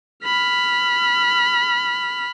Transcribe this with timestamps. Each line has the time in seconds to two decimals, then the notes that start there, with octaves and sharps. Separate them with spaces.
0.24 B5 F6